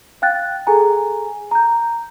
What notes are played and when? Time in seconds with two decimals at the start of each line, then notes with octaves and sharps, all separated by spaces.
0.22 F5 G5 F#6 A6
0.67 G#4 A4 G#5 A#5
1.51 A#5 G6